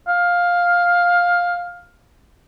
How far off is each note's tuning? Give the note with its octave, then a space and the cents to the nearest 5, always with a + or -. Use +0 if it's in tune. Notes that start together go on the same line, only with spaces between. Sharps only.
F5 +10